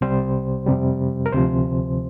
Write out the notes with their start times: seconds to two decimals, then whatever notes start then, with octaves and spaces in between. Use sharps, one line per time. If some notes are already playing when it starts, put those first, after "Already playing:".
0.01 C2 C3 G3 C5
0.66 F2 C3 G3
1.26 A#4
1.32 D2 C3 F3 C5